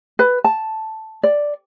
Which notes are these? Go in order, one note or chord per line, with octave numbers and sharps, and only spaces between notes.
B4
A5
D5